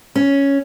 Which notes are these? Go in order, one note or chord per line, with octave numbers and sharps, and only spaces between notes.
C#4